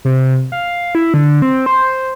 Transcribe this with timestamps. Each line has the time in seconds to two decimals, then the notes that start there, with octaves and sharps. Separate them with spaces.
0.05 C3
0.52 F5
0.95 E4
1.14 D3
1.42 C4
1.66 C5